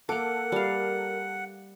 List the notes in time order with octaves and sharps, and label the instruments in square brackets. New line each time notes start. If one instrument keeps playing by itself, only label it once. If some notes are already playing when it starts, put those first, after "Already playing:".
[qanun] A#3 D6 [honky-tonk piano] A4 [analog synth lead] A#4 [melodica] F#5
[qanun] G3 F5